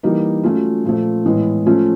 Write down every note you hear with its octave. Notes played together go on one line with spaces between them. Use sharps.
E3 G3 A#3 D#4
F#3 A3 C#4 F4
A#2 F3 A3
A2 E3 G#3 B3
F3 A3 C#4 F4